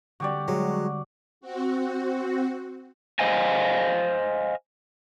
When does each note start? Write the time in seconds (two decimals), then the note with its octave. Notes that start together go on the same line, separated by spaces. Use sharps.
0.20 D3 G3 C4 F#4 G4 D5
0.48 F#3 G#3
1.41 C4 F#4
3.19 C5 D#5 F5 G#5